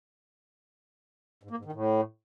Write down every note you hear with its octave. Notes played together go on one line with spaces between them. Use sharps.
G#2
A#3
G#2
D#3
A2